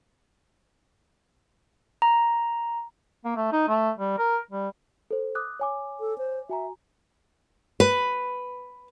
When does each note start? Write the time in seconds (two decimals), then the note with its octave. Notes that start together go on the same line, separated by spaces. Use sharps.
2.02 A#5
3.25 A#3
3.36 A3
3.52 D#4
3.68 A3
3.98 G3
4.18 A#4
4.51 G3
5.11 A4 C5
5.35 D6 D#6 F#6
5.60 C#5 G#5 D6
6.00 A4
6.18 C5
6.49 F#4 E5 G#5 A#5
7.80 B4